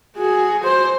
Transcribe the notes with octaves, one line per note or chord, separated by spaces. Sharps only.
F#4 G#4
C5